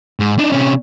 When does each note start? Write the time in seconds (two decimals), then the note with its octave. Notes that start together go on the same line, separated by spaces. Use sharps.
0.20 G#2
0.39 D4 D#4
0.52 C3 C#4